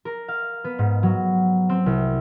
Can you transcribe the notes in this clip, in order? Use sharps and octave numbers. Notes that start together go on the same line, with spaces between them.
A#4
F5
B3
G#2
F#3
C4
C2